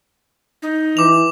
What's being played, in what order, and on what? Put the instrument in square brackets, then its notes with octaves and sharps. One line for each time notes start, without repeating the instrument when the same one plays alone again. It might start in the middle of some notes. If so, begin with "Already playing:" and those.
[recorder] D#4
[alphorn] E3 [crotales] D6 F7